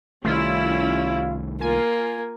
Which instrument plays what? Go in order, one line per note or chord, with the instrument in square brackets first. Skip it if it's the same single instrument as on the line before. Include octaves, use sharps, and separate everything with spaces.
[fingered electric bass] C2 D#3 A3 [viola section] G3 C#4 E4 [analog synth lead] F4
[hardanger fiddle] A#3 [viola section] F4 [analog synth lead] G#5